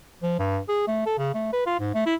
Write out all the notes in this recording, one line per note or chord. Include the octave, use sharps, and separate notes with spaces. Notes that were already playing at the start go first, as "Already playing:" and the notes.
F3
G2
G#4
A3
A4
C#3
A3
B4
F4
G#2
A3
E4